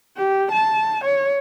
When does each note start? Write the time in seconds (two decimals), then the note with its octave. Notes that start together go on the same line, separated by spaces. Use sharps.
0.17 G4
0.52 A5
1.05 C#5